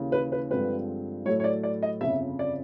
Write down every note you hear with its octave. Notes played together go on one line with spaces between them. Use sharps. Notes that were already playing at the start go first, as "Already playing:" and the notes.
Already playing: D#2 C#3 E3
B4
B4
G2 D3 F3 G#3 C4 B4
A2 F#3 A3 C#5
C#5
D5
D5
D#5
G1 F2 C#3 E5
D5